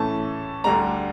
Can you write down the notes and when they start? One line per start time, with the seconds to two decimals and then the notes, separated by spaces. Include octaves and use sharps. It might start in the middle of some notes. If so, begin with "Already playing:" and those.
Already playing: A2 E3 A3 C#4 A5
0.64 D2 D3 G3 D4 A#5